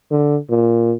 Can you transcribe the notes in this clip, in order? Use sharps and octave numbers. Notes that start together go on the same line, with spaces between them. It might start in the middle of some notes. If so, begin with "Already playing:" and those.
D3
A#2